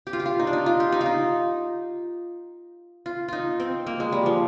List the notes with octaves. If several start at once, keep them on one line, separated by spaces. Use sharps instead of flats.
G4
F4
G4
F4
D#4
D4
D#4
F4
G4
D#4
F4
D#4
F4
D#4 F4
C4
A#3
G#3
G3
F3